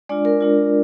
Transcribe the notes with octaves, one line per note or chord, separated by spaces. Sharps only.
G#3 D4 F4 D5
A#4
G#3 D4 F4